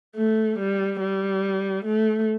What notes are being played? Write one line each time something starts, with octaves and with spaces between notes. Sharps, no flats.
A3
G3
G3
A3